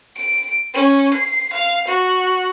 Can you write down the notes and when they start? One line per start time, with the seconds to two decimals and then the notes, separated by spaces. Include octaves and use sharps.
0.16 D7
0.74 C#4
1.14 C7
1.54 F5
1.88 F#4